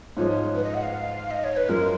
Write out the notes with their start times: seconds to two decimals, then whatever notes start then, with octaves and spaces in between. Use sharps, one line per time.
0.17 G#2 F3 G#3 C#5
0.30 C#5
0.55 B4
0.64 D#5
0.74 F#5
0.83 F5
1.31 D#5
1.44 C#5
1.57 B4
1.69 F#2 F3 G#3 A#4